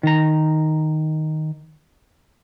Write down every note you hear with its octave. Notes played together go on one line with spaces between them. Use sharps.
D#3 A#5